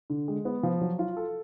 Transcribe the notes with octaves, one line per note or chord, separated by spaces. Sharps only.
D3
G#3
B3
F3
F#3
F4
A4